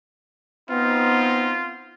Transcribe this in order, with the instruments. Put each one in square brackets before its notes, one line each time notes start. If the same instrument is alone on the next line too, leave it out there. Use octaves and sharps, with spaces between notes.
[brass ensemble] B3 C4 D#4 [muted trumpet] F4